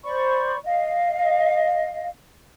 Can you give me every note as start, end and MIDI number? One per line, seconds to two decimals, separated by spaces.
0.05 0.58 72
0.05 0.58 74
0.05 0.58 83
0.05 0.58 85
0.65 2.08 75
0.65 2.08 77